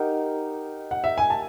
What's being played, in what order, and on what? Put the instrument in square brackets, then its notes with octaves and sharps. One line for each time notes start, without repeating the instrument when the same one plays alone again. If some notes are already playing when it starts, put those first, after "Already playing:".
Already playing: [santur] D#4 G4 A#4 [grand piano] F#5
[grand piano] F#5
E5
G#5
A5